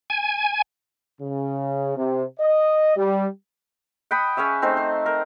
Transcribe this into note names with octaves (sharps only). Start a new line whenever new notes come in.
G#5
C#3
C3
D#5
G3
F#5 G5 B5 D#6
C#4 G#4 C#5 E5
A3 C4 D#4 C5
C5
A#4